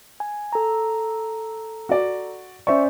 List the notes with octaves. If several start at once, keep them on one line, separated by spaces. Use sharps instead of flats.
G#5
A4 A#5
F#4 D5
C#4 C5 D5 E5 C#6